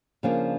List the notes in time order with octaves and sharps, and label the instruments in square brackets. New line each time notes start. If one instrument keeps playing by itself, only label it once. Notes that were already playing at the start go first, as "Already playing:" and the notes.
[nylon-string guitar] C#3 F3 A#3 D4